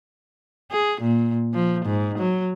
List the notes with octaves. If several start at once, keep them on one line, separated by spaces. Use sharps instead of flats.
G#4
A#2
F3
G#2
F#3